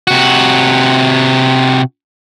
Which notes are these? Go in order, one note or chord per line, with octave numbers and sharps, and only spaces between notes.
C3 F#4